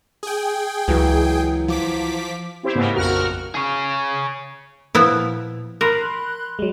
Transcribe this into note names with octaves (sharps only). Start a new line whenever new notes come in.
G#4 G5
C#2 E3 F#3
F3 D6 B6
C4 E4 G4 C5
G#2 C#3 A#3 B3
A#1 F2 F#4 A#4 F6
G#4 C#5
A#2 F3 B3 E4
A#4 B5 C6 F#6
F#3 G#3